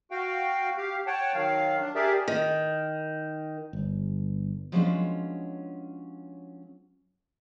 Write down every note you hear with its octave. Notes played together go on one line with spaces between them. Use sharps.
F#4 F5 G5
G4 F5
C#5 F#5 G5 A5
D#3 F#3 F5
D4
G4 G#4 A#4 D5 E5
D#3
G1
F3 F#3 G#3 B3 C#4 D4